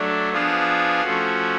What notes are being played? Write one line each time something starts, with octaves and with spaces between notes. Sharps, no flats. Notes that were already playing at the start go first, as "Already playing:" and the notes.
Already playing: F#3 A3 D4
F3 B3 D4 F4 G#4
F3 A3 C#4 F#4